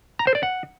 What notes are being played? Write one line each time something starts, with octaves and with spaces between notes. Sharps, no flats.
A#5
C5
D5
F#5